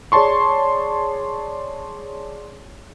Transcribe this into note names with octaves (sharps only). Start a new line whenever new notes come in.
G#4 C#5 D5 A5 C6 C#6